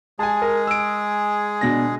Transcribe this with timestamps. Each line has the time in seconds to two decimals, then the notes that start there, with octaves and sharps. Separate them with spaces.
0.19 G#3 G#4 G#5 A5
0.42 A#4 G#5
0.67 E6 D7
1.61 B2 D4 A#6